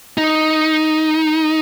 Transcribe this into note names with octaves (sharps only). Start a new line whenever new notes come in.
D#4